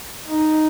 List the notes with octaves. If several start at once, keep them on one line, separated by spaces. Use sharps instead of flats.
D#4